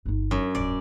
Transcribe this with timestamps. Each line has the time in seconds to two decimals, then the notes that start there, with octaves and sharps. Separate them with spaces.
0.06 G1 D#4
0.31 F#2
0.55 D1 G1 D5